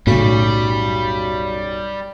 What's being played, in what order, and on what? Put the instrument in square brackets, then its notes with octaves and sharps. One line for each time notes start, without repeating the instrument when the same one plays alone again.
[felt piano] B1 [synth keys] F#2 F#4 B6 [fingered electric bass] A2 C#3 [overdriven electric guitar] G3